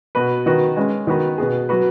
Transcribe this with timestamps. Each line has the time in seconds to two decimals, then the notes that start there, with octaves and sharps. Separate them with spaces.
0.15 B2 B3 F#4 B4
0.46 D#3 B3 F#4 B4
0.77 G#3 C#4 B4
1.07 D#3 B3 F#4 B4
1.38 B2 B3 G#4
1.69 F#3 B3 F#4 B4